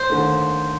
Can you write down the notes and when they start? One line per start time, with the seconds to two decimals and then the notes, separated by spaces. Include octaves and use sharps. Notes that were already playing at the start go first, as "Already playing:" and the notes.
Already playing: C5
0.10 D#2 D3 A3